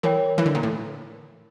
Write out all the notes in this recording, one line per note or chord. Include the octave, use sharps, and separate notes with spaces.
E3 A#4 C#5 G5
E3
D3
A#2
A2